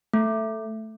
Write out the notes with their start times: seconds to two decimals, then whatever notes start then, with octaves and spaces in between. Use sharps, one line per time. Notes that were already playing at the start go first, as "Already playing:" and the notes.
0.14 A3